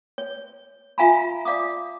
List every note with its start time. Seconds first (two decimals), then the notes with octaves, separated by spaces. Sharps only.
0.18 C#5
0.98 F4 E5 F5 G#5 A#5 B5
1.45 D5 F5 D6 D#6